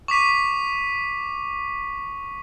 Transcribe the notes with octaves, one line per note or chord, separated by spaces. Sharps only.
C#6 D6 B6 D#7